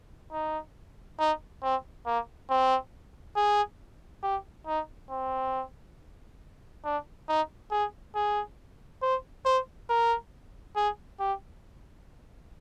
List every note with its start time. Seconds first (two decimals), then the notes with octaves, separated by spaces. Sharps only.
0.32 D#4
1.19 D#4
1.63 C4
2.06 A#3
2.50 C4
3.36 G#4
4.23 G4
4.67 D#4
5.10 C4
6.84 D4
7.28 D#4
7.71 G#4
8.15 G#4
9.02 C5
9.45 C5
9.89 A#4
10.76 G#4
11.20 G4